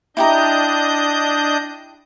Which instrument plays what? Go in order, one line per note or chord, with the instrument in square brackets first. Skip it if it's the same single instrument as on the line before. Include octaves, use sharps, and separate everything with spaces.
[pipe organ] D4 D#5 G6 [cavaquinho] E4 G4 A#5